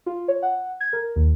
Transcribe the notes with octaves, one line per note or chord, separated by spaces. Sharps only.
F4
C#5
F#5
G#6
A#4
D#2